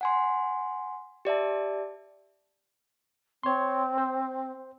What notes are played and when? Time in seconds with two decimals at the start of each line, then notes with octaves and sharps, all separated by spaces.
0.01 F#5 G#5 C6
1.25 G4 D5 E5 A5
3.43 C4 C#5 C6
3.98 C5